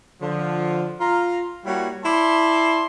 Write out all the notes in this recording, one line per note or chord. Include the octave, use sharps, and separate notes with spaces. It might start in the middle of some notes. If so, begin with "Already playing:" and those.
D3 F3
F4 A#5
G3 A#3 E4 F#4 C#5
E4 D5 A5 C6